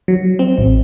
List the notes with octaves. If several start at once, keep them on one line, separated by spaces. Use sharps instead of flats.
F#3
C4
A1